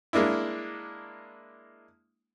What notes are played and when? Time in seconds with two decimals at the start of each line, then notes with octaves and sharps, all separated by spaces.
0.13 G#3 A#3 D4 E4